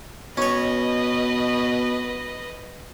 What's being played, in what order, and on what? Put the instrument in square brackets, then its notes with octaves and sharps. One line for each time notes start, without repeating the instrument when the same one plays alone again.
[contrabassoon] B2 [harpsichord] C#4 C#5 [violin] B4 D#5